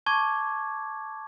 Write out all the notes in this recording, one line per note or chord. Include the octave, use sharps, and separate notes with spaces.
A5 C#6 D6 G#6